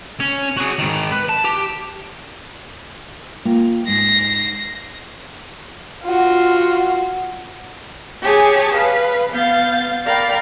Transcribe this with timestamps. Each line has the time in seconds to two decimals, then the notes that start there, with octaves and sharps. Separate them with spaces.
0.20 C#4
0.57 F#4 G#4
0.79 G#2 D#3
1.12 B4
1.29 A5
1.44 G4
3.45 A#3 F4 G5
3.87 G#2 A#6 C7
6.04 F4 F#4
8.23 G4 G#4 C#5 G#5 A5
8.73 B4 F5
9.31 B3 F5 G6 A6
10.06 A#4 D5 F5 G5 B5